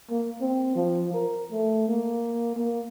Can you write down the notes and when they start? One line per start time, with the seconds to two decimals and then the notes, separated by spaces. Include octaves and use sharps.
0.10 A#3
0.41 C4
0.75 F3
1.14 A#4
1.51 A3
1.89 A#3
2.56 A#3